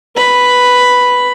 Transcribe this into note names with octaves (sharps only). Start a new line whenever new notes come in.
B4 B5